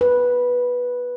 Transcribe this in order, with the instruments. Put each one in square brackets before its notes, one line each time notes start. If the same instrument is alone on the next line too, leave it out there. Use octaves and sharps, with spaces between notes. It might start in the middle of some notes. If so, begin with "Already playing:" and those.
[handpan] B4